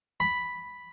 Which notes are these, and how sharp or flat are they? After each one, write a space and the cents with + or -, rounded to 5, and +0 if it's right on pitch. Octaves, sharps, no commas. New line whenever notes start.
B5 +0